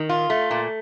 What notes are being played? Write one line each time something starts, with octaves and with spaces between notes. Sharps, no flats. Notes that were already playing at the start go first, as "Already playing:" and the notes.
Already playing: D#3
F4
A3
A#2